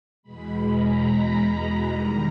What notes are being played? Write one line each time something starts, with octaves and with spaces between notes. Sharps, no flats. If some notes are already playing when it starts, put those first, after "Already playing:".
E2 B2 G#3 B5
A#5
B5
E2 D#3 G3 A#5